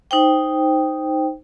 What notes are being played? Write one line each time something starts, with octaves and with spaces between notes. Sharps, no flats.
D#4 C5 G5